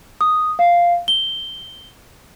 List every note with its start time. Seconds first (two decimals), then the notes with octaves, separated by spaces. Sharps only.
0.21 D#6
0.59 F5
1.08 G7